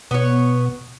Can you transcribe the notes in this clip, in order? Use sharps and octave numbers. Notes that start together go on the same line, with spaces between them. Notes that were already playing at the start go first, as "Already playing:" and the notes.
B2 B3 C#5